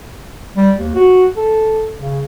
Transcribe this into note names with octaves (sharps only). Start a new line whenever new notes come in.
G3
D#2
F#4
A4
C#3